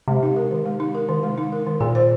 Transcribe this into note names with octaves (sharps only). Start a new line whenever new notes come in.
C3 G#3
D#4
A#4
D#3
G#3
D#4
A#4
D#3
G#3
D#4
A#4
D#3
A#2 G#4
C5